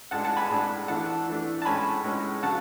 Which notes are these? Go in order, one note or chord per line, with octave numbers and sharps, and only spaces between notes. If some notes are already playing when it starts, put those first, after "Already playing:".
A2 G#3 D4 F#5 A5
F#5 A5
G#5 B5
A2 G#3 D4
E3 A3 D4 F#5 A5
E3 A3 D4
A5
A2 G#3 C#4 G#5 B5
A2 G#3 C#4
C#3 F#3 F#5 A5